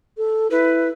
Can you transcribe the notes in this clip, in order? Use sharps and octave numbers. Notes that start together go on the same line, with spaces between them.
A4
E4 B4